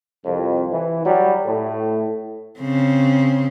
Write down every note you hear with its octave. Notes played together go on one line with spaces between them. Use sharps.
C2 F2
E3
F#3 G3
A2
C#3 C4